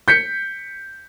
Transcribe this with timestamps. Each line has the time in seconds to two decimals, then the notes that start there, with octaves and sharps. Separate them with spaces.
0.08 G6 B6 C#7